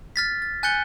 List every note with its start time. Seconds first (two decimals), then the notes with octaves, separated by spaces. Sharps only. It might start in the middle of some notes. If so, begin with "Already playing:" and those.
0.16 F6 A6 B6
0.42 A6
0.63 G#5 F#6 G6 A6 C#7 G7